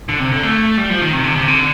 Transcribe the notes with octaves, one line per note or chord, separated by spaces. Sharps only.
D3
C3
D3
A3
G3
F3
D#3
C3
D3
C3
D3